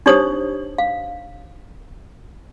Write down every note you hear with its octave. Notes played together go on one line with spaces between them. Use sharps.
D4 D#4 G4 C5 C#5 D#6
F5